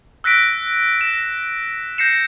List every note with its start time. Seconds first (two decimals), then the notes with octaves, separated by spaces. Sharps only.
0.24 E6 F#6 A#6 B6 D7
1.01 A#6 E7
1.98 G6 A#6 C7 C#7 E7